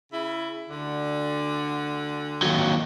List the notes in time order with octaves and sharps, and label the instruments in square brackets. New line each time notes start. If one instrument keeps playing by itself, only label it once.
[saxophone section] C#3 E4
D2 D3
[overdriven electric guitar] D#2 F#3